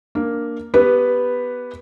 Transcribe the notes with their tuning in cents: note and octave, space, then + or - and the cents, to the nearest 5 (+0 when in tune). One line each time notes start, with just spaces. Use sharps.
A#3 +0 D4 +0
B3 +0 G4 +0 B4 +0